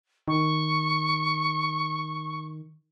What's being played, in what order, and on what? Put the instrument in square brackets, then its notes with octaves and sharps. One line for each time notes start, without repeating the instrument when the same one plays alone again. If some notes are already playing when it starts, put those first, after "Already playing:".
[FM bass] D#3 [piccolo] C#6